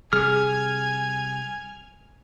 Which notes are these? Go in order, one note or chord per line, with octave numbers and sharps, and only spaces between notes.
C3 G3 G#4 G#5 F6